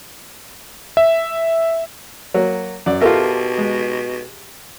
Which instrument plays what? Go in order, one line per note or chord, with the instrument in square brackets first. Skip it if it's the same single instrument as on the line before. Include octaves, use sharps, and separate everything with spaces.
[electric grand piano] E5
[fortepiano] F#3 A#3
F#2 D5
[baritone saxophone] B2 [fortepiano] F4 E5 [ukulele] G4 A4 A#4
[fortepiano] G#3